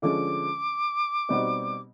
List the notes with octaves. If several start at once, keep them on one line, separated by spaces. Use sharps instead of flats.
D3 F3 G#3 C#4 D6
B2 G3 C4 D#4 F#4